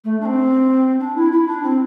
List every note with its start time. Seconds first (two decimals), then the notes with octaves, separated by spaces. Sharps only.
0.04 A3
0.21 D4
0.25 C4
1.00 D4
1.16 E4
1.32 E4
1.48 D4
1.63 C4